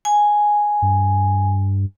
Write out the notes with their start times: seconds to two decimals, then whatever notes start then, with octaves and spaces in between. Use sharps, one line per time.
0.05 G#5
0.82 G2